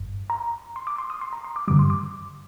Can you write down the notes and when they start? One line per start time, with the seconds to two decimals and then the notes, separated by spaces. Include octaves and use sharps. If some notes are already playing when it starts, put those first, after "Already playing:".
Already playing: G1 G2
0.30 A#5
0.76 C6
0.87 D6
0.98 C6
1.10 D#6
1.21 C6
1.33 A#5
1.44 C6
1.56 D6
1.68 G2 D3 G3 D6
1.79 C6
1.90 D6